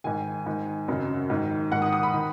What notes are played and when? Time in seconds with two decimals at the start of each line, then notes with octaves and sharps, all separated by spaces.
0.04 G#2 D#3 G#5
0.46 G#2 D#3
0.88 F#2 C#3 D#5
1.30 G#2 D#3
1.72 G#2 D#3 F#5
1.82 D#6
1.93 D#6
2.03 B5
2.14 D#3